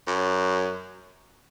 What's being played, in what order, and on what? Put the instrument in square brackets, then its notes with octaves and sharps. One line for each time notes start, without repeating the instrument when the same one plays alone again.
[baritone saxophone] F#2